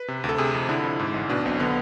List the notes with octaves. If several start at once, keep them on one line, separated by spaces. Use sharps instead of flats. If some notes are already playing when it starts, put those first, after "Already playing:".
Already playing: B4
C3
D2
A4
C3 G#4
F2
D3 E4
F2
G#2
A1
B2 D4
B1 C4
D3 B3